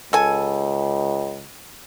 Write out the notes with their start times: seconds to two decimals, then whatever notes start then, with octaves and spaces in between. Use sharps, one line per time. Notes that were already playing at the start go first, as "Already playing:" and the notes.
0.13 C#2 A4 G#5